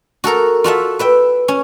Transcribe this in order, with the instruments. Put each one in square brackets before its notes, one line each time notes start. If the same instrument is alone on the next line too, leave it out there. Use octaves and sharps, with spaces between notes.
[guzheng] F#4 A4 A#4 A#5
F4 F#4 A4 E5
B4 E5 G5
C#4